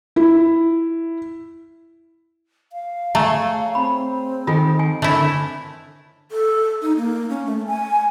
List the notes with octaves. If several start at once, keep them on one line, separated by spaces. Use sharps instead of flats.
E4
F5
A3 G#4 C#5 A#5
C4 B5
D#3 F4 A4 G#5
G#5
D3 A3 E4 A#4 C#5
A4
D#4
A#3
C#4
A3
G#5